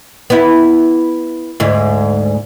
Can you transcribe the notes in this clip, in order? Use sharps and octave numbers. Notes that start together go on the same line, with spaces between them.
B3 E4
D2 G#2